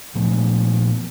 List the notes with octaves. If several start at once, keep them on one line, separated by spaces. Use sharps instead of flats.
A#2 F3 A3 B3